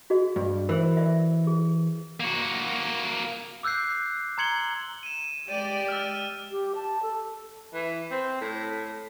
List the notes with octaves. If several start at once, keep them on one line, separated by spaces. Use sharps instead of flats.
F#4 G#4 D#5
G2
E3 A#4 C5
D5 E5
G#4
A#3 F#4
D6 E6 F#6 G6 C7
A#5 C6 G#6 C#7 F#7 G7
D#7 E7
G#3 G4 D5 D#7
E6 F6
G4
A5
A4
E3
C4
A2